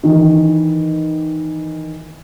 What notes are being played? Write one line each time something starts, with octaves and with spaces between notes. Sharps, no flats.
D#3 E3